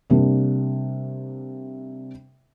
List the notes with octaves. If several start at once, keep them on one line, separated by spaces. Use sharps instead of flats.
C3 G3 A#3 D4